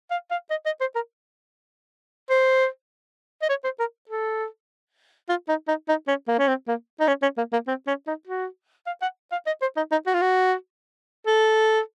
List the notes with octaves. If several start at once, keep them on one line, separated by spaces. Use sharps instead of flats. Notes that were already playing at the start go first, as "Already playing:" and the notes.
F5
F5
D#5
D#5
C5
A#4
C5
D#5
C#5
C5
A#4
A4
F4
D#4
D#4
D#4
C#4
A#3
C#4
C4
A#3
D#4
C#4
C#4
A#3
A#3
C4
C#4
D#4
F#4
F5
F#5
F5
D#5
C5
D#4
D#4
F#4
F4
F#4
A4